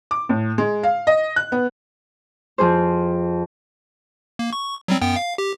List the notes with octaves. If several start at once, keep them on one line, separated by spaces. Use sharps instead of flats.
D6
A2
G#3
F5
D#5
F#6
B3
F2 G#4 C5
A#3
C#6
F#3 G3 C4
F#2 B3 G5
F5
G4